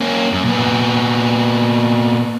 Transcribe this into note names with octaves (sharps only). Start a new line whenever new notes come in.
A#3 C#4
F#2
A#2 B3